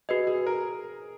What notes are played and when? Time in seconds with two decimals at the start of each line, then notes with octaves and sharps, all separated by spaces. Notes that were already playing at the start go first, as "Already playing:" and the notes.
0.09 F#4 G#4 B4 D#5
0.27 G#4
0.47 A#4